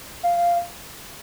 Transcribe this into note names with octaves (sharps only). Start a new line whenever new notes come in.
F5